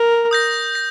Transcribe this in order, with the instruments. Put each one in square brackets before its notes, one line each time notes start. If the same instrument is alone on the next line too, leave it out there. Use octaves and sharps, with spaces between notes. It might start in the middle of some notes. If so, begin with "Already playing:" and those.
Already playing: [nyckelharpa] A#4
[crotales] D#6 G6 A#6
A#6